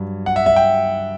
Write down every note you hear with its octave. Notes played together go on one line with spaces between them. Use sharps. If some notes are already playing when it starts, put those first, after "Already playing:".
Already playing: G2 F#3
F#5
E5
E5
G5